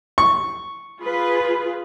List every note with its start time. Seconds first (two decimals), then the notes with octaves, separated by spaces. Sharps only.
0.18 C#6
1.01 F4 G#4 B4